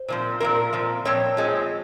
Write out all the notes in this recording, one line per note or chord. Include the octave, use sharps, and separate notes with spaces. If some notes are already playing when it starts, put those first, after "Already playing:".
Already playing: C5
A#2 F3 C4
A#2 F3 C4 A#4
A#2 F3 C4
A#2 F3 C4 C#5
F3 G#3 C4